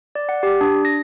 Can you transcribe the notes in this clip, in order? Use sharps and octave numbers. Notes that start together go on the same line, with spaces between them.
D5
F#5
G4
D4
A#6